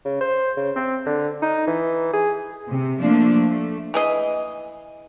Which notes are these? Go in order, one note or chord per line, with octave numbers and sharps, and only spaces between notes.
C#3
C5
C#3
C4
D3
D#4
E3
G#4
C3
F3 A3 A#3 D4
A3
E3 G#4 D#5